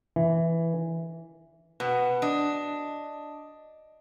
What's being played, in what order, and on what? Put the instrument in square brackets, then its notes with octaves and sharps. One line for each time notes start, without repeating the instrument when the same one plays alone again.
[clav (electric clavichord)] E3
[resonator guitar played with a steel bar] B2 [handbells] B4 F#5
[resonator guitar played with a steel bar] D4 [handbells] D#5 D#6